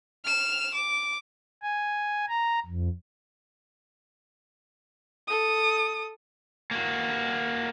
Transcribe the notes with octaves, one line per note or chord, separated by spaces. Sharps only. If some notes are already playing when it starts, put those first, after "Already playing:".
F6 E7
D6
G#5
A#5
F2
A4 D#6
A#3 F#4